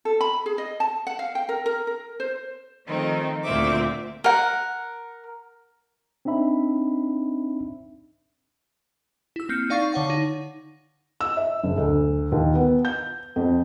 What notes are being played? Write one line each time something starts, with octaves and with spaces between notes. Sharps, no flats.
A4
B5
G#4
D#5
A5
F#5
F5
G5
A#4
A#4
A#4
C5
D#3 F3 A3 C4 D#4
D2 A#2 C4 E5 D6
A#4 F#5
C4 D4 D#4 E5 B5
E4 E6
A#3 C4 F6 G6 C#7
D#4 D5 F5 C#6 A6 C7
D3 C#5 F#5 C#6
D#4
E6
E5
F#1
D2
D#2
B3
G6
F2